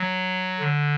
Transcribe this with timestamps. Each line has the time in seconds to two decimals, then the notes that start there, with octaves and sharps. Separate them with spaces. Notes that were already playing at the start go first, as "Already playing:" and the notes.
Already playing: F#3
0.59 D3